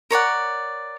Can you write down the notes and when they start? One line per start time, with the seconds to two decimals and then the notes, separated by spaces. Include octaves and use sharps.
0.11 A#4 C#5 D5 F#5